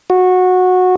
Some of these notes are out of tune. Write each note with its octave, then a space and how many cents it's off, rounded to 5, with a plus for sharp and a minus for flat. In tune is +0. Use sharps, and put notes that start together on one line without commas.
F#4 -15